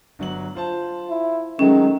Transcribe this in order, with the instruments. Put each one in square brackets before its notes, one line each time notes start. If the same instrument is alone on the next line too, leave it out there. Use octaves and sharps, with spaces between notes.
[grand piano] G1 F#3 F#7
F4 C5 A5
[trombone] E4
[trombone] D#3 [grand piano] F#3 G#3 A3 [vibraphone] C#4